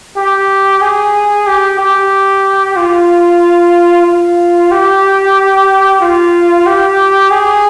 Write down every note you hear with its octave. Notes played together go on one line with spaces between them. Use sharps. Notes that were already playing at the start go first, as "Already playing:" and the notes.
G4
G#4
G4
G4
F4
F4
G4
F4
G4
G#4